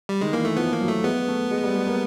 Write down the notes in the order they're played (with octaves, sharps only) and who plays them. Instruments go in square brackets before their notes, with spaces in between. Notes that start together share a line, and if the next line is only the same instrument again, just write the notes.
[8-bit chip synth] G3
[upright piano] D#3 [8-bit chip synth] G#3
[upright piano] E3 [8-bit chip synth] A#3
[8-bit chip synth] A3
[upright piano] F3 [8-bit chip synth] B3
[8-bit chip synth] A#3
[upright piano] F#3
[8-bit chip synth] A3
[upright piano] G#3 [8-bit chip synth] B3
[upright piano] A3
G#3
G3
G#3
A#3